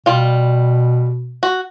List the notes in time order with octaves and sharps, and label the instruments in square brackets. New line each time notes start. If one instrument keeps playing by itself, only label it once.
[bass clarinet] B2 [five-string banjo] G3 F4
[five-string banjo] F#4